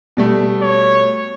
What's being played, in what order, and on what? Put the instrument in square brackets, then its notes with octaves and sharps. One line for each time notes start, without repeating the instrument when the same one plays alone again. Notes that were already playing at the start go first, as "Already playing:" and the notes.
[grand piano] B2 G3 A3
[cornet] C#5